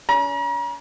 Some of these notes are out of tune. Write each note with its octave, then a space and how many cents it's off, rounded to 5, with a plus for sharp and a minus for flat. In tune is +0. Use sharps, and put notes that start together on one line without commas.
C#4 +40 A#5 +40